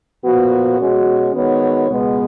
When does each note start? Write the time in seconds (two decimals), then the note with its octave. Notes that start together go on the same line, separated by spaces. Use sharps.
0.24 A#2 F3 B3 F#4
0.79 B2 G#3 C#4 F#4
1.34 D#3 G#3 B3 F#4 C#5
1.89 C#2 B2 G#3 B3